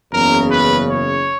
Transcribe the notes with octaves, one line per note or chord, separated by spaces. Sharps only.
F#1 E2 C#3 A#4
B4
C#5